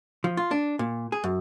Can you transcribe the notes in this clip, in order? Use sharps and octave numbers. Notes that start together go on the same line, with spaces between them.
F3
F4
D4
A#2
G#4
F#2